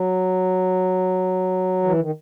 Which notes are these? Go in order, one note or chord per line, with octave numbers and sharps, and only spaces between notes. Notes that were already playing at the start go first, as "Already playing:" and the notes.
Already playing: F#3
E3
D#3